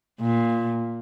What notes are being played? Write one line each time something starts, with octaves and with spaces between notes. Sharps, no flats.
A#2